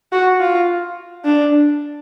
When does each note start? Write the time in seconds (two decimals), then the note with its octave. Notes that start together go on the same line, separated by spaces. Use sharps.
0.12 F#4
0.40 F4
1.25 D4